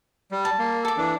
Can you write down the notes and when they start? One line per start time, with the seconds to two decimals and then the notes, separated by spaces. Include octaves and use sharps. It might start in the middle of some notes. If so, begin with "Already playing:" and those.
0.32 G3
0.45 A5
0.59 A#3
0.85 A4 D6
0.97 E3 D4